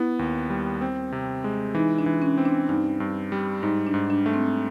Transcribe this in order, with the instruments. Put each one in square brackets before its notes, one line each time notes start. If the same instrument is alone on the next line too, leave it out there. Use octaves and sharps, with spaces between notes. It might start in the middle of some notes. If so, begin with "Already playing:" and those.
Already playing: [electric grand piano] B3 [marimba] E4
[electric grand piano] D#2
G3
C4
C3
G#3
[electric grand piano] E3 [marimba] D#4
[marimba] D4
[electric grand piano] E3
[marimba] C#4
[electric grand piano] C4
[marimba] D4
[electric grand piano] G2 [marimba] D#4
[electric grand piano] G2
G3
[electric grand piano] G#2 [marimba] D#4
[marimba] D4
[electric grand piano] G#2
[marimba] D4
[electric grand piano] A3
[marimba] C4